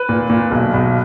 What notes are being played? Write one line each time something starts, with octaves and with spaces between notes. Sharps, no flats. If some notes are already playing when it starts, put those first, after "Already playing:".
Already playing: B4
A#2
A#2
B1
B1